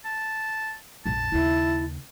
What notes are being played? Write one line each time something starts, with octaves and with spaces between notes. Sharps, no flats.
A5
A#1 F2 A5
D#2 C#3 E4